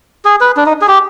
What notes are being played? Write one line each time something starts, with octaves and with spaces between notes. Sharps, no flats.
G#4
B4
D4
D#4
G#4
G4